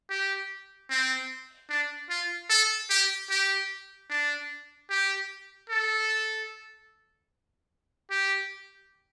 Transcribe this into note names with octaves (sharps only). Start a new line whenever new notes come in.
G4
C4
D4
F4
A4
G4
G4
D4
G4
A4
G4